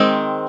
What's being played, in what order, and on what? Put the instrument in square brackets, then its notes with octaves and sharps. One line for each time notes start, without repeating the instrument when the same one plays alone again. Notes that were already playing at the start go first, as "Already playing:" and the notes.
Already playing: [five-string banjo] D#3 G#3 C4